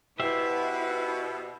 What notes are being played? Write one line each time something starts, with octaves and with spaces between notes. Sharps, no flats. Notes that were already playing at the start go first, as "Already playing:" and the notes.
B2 E4 G4 B4 C5 E5